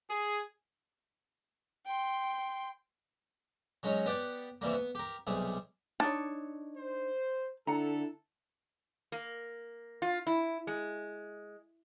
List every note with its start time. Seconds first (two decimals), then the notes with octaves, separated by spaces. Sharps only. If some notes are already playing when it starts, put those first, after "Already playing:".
0.11 G#4
1.86 G5 C6
3.83 F#3 G#3 C#4 D#4 C#5
4.06 B3 G4 D5 F#5
4.61 C3 E3 G3 A#3
4.73 B3
4.95 G4 A#4
5.27 B1 C3 G3 G#4
6.00 D4 D#4 C#5 A5
6.76 C5
7.67 D3 E4 A4 F#5 A#5
9.12 A#3
10.02 F4
10.27 E4
10.67 G#3